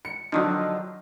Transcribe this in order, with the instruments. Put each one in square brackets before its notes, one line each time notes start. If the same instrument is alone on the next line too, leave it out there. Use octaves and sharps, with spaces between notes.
[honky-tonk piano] C#7
[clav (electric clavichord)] D3 D#3 F3 [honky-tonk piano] F#3 D4 D#4